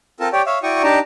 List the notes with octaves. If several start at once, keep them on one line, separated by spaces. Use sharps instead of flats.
C4 F4 A4 A#4 A5
G4 C#5 D5 G5
C#5 E5 F5
E4 F#4 D5 G5 C#6 D#6
D4 D#4 G4 G5 A5 A#5